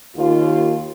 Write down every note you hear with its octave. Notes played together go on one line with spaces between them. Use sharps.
D#2 F4